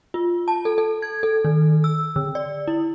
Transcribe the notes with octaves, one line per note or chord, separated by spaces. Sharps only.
F4
A5
A4
A4
G#6
A4
D#3
E6
D3
D5
E4